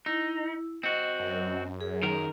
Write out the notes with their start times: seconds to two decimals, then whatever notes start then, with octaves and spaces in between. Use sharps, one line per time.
0.06 D#4 E4
0.83 C4 F#4 D#5
1.20 F#2
1.81 G#4
2.03 D#3 A#4